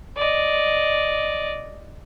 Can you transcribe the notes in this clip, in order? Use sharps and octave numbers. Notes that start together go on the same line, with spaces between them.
D5 D#5